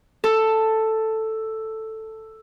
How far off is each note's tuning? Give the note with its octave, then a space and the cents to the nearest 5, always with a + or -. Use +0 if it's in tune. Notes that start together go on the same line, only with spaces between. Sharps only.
A4 +5